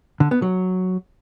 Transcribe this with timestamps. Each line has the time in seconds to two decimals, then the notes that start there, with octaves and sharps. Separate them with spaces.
0.20 D3
0.31 B3
0.42 F#3